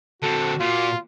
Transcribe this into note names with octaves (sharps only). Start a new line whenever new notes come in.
D3 C4 F#4 A4
A#2 F4